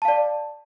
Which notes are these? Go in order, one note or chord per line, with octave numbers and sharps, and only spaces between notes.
D5 F5 A5